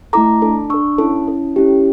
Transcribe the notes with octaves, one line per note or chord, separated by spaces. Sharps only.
A3 E4 A4 A#5 D6
D4 A4
D4 A4 C#6 E6
C#4 E4 A4
C#4 E4 A4
C#4 E4 G4